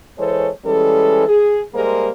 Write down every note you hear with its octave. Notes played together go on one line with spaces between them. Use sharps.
E3 G#3 A4 C5 C#5
E3 G3 G#3 C#4 A4
G#4
G3 G#3 A#3 G#4 A#4 C5